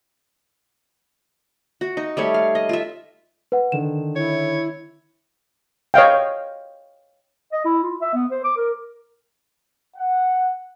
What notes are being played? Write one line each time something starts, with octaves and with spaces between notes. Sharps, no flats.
F#4
D#4
G3 A3 C#5
F5
D#5
F4 E5
B4 F#5
D3 D#3 E7
E4 C#5
C#5 D#5 F5 G5
D#5
E4
F4
E5
B3
C5
D6
A#4
F#5